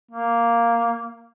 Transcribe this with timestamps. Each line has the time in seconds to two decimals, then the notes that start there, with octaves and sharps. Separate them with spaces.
0.11 A#3